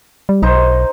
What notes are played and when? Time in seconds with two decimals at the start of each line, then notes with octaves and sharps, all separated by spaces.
0.29 G3
0.43 B1 D#4 C5